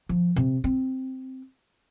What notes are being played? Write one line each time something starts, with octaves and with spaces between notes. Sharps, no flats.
F3
C3
C4